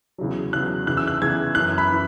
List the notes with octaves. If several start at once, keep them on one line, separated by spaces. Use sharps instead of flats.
E2 C#3 F#3
E2 C#3 F#3 F#6
E2 C#3 E3 F#6
E6
F#6
E2 C#3 E3 G#6
F#2 E3 F#6
B5
E3